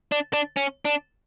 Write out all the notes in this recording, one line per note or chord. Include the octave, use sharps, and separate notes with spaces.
D4
D4
C#4
D4